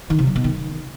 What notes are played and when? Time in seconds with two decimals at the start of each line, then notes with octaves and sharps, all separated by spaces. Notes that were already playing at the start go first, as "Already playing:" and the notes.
0.10 D#3
0.19 C3
0.27 F#3
0.36 B2
0.44 D#3